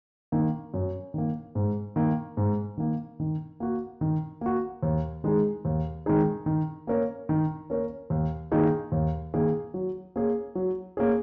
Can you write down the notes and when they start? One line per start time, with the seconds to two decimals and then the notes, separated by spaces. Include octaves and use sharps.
0.32 D#3 A#3
0.74 F#2
1.14 D#3 A#3
1.55 G#2
1.96 D#3 A#3
2.37 G#2
2.78 D#3 A#3
3.20 D#3
3.60 A#3 F#4
4.01 D#3
4.41 A#3 F#4
4.83 D#2
5.24 D#3 G#3 D#4 G#4
5.65 D#2
6.06 D#3 G#3 D#4 G#4
6.46 D#3
6.87 A#3 C#4 A#4 C#5
7.29 D#3
7.70 A#3 C#4 A#4 C#5
8.10 D#2
8.52 D#3 A#3 D#4 G#4
8.92 D#2
9.34 D#3 A#3 D#4 G#4
9.74 F#3
10.16 A#3 C#4 G#4
10.55 F#3
10.97 A#3 C#4 G#4